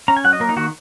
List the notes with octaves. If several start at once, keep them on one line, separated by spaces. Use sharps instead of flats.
C#4 A#5
G#5
F#3 F#5
D#5
A#3 A#4
D#4
D#3 F#4